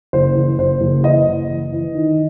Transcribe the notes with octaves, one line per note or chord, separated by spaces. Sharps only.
F#1 C5
E3
F#1 C5
F#1
E3 D#5
F#1
E3
E3
D#3